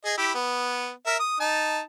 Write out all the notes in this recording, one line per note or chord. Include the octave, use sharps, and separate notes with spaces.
G#4 D#5
E4 G4
B3
A#4 E5
D#6
D#4 A5